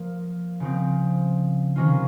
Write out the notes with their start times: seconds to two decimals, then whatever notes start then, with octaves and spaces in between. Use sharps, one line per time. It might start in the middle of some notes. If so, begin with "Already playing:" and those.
Already playing: F3 A#3 F4
0.60 C#3 F3 C4
1.76 C3 D#3 A#3 C#4 F4